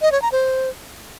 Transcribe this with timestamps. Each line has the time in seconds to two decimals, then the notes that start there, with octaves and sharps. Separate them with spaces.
0.02 D#5
0.12 C#5
0.22 A#5
0.32 C5